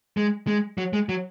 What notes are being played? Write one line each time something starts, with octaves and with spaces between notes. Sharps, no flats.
G#3
G#3
F#3
G#3
F#3